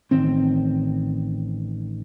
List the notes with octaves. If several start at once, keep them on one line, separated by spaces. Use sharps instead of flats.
A1 D#3 C4